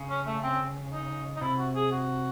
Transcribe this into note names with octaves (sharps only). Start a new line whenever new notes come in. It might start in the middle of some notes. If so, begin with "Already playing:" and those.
Already playing: C#3
C#4
A3
C4
D#4
D#4
C3 E4
F#4
G#4
F#4